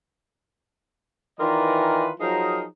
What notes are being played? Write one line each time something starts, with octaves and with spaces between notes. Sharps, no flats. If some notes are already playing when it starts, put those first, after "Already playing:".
D#3 E3 F4 A#4 B4 D5
F3 F#3 D#4 G#4 A#4